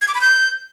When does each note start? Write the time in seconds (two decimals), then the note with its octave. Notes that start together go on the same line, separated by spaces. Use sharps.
0.02 G#6
0.08 D6
0.15 B5
0.21 G6